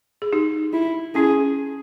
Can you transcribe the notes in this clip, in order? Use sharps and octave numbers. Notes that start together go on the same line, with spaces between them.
G#4
D#4 G4
E4
C#4 E4 G#4